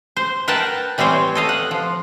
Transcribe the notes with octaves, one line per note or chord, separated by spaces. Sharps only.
C5
A#4 B4 F#5 G5 A5
E3 G3 C4 C5 C#5
A4 D#5 F5
F#5
F3